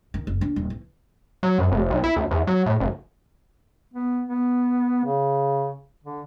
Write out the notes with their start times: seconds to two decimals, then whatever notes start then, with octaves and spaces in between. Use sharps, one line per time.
0.14 D#3
0.27 F#1
0.41 D4
0.56 D#1
0.70 E3
1.43 F#3
1.58 F#2
1.72 F1
1.90 B1
2.04 E4
2.16 D2
2.31 E2
2.47 F#3
2.66 A2
2.80 F#1
3.94 B3
4.27 B3
5.05 C#3
6.04 D3